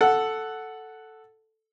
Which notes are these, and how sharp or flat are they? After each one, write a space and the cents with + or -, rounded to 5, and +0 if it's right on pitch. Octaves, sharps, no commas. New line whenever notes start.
A4 +0 F#5 +0